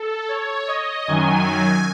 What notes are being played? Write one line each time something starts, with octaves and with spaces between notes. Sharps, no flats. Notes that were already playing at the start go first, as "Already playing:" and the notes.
Already playing: A4
C#5
D#5
F#2 D#3 F#3 G#5